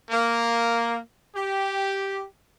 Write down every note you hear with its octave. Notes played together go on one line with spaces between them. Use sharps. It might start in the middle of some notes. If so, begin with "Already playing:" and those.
A#3
G4